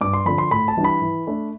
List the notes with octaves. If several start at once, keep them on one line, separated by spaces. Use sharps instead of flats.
G2 D6
C6
D3 F3 B5
C6
A2 B5
A5
E3 G3 D4
B5
E3
A3 D4